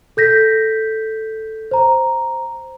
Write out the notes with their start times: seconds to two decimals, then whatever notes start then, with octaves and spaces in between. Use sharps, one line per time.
0.17 A4 G6 A#6 B6
1.71 C5 A#5